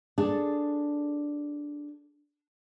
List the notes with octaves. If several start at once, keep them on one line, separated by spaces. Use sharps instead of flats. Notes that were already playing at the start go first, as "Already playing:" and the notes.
D4 G#4 A4